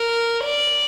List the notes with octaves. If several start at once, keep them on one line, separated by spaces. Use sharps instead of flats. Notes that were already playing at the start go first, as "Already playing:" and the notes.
Already playing: A#4
D5